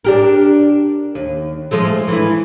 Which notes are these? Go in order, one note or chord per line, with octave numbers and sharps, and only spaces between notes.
D4 G4 A#4
D#2
F3 G#3 A3
E3 E4